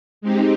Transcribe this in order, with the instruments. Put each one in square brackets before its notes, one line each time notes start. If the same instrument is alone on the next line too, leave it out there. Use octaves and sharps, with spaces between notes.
[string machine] G#3 C4 D#4 G4